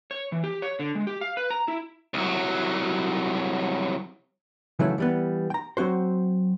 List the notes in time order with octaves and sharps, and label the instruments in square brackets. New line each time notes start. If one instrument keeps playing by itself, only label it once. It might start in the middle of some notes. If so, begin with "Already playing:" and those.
[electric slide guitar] C#5
E3
G4
C#5
D3
G#3
G4
F5
B4
A#5
E4
[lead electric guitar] C2 F#3
[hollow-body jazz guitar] C#3 E3 F#3 A3 E4
E3 G3 B3
G5 A#5
F#3 C4 F#4 C5